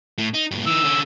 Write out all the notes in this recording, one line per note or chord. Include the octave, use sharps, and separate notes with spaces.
A2
D#4
G2 A#2
E3 D#4 E6
D3 C#4